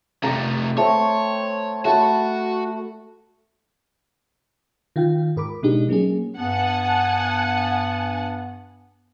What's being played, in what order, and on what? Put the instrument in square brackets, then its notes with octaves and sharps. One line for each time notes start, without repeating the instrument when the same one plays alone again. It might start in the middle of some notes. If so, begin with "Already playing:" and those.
[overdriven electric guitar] C3 A3 [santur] D5 G5 A#5
[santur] A3 C4 [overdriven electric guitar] C#5
[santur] A3 A5 B5 [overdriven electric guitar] F#4
[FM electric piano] D#3 F4 F5 G5
G#2 A#4 B5 D6
B2 G#3 D4 D#4 G4
F#3 A#3 C#4 G#4
[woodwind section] G2 B3 [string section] F#5 G#5 A5